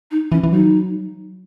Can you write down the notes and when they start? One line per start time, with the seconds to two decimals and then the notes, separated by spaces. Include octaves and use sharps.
0.11 D#4
0.31 E3 C#4
0.44 E3
0.52 F#3 D#4